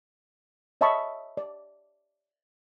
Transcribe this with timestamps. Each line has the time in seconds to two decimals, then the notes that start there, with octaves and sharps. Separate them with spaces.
0.81 C#5 D#5 E5 A5 B5 C#6
1.37 D5